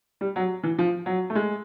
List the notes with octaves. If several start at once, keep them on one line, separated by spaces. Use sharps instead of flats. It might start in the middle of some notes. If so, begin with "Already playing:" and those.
G3
F#3
E3
F3
F#3
A3
G#3